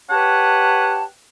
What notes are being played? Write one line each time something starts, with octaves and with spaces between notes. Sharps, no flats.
G4 B4 C#5 F#5 A5